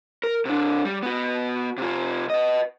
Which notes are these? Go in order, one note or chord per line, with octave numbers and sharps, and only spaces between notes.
A#4
C3 D4
G3
B3 F#4
C3 F4
B4 D#5